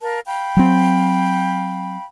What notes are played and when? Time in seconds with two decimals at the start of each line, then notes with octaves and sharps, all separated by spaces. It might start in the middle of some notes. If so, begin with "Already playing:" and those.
0.01 A#4 F5 A5
0.26 F5 G5 B5
0.57 F#3 C4